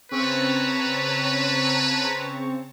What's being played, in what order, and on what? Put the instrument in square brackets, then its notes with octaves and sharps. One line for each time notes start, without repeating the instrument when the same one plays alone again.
[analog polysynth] C#3 C4 C#6 [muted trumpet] B4 [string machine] C#5 A5 A#5